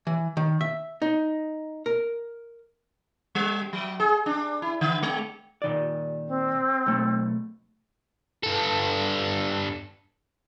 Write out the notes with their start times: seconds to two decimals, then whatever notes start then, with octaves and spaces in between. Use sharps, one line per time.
0.07 E3
0.37 D#3
0.61 E5
1.02 D#4
1.86 A#4
3.35 G3
3.73 F#3
4.00 G#4
4.26 D4
4.62 E4
4.81 D3
5.03 G#3
5.62 A#2 D#3 D5
6.28 C4
6.86 B1 A3
8.43 G2 A4